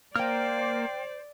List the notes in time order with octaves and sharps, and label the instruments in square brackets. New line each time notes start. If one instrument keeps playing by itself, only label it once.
[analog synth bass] A#3 [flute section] C5 [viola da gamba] D5 [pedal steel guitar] G5 F6